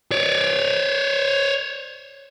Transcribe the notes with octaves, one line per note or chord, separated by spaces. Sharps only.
C#5 D5